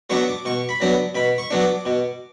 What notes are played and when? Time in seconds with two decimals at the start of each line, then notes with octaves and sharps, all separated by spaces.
0.10 F#3 B3 D4 C#6
0.28 D6
0.45 B2 C#6
0.69 B5
0.80 F#3 B3 D4
1.15 B2 B5
1.38 C#6
1.51 F#3 B3 D4
1.61 D6
1.86 B2